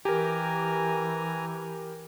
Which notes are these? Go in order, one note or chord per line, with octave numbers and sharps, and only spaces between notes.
E3 G4 A#4 G#5 A#5